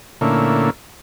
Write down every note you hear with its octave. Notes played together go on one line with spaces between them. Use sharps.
A#2 D3 A3 A#3 C#4 E4